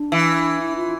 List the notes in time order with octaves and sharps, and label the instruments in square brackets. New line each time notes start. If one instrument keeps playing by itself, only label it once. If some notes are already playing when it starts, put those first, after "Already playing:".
Already playing: [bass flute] D4
[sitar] E3
[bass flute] E4
F4